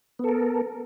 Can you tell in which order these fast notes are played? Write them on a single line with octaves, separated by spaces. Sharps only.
B3 A4 A#4